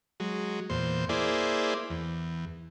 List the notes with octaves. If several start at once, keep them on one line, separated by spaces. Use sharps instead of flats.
F#3 G#3
E2 A#2 C5
A#3 E4 G#4 C5 D5
E2